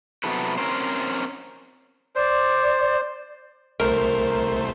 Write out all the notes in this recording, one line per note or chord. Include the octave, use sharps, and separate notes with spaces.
C3 F#3 B3 E4 A4 B4
C4 C#4 A#4 C5
C5 D5
C2 A3 A#4 C5